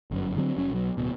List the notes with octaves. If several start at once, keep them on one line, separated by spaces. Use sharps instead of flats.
G1 F#2
D3 F#3 B3 C4
F1 F#3 C#4
B1 F#3
D1 B2